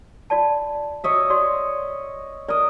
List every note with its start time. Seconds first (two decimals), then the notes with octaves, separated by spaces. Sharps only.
0.30 F4 D5 A5
1.04 C#5 D#5 E5
1.30 F#4 D5 C6
2.48 A#4 D5 D#5